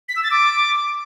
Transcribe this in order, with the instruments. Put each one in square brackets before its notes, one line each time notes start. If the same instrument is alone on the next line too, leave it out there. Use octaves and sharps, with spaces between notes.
[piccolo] B6
E6
A6
D6